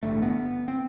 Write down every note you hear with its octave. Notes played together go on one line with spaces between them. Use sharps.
A1 G2 D3 A3
B3
C4